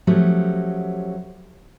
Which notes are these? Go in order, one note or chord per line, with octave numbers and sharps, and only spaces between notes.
F3 F#3 A3 C#4 F#4 G4